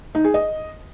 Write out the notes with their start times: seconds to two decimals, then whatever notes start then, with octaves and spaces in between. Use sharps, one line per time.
0.15 D#4
0.24 G#4
0.34 D#5